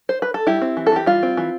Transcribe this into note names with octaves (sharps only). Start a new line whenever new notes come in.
C5
B4
A4
G3 E4 G4
C4
E3
A4
E3 G4
G3 F4
C4
E3